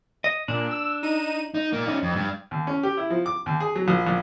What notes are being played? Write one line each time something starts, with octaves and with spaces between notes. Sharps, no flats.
D#5
A#2 D4
E6
D#4 D#7
D#4
A#2 A#3
C#4 D#4
F2
G2
D#2
C#4
G4
E4
F3
D6
D#2
G#4
F#3
A#1
A#1